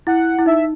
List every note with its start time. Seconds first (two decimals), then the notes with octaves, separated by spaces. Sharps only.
0.07 E4 F#5
0.38 E4
0.46 D#4 E5